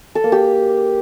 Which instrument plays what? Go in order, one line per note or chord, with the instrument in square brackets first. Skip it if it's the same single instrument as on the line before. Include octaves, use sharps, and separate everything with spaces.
[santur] A4
A#3
G4